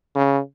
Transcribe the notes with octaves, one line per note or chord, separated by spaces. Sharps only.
C#3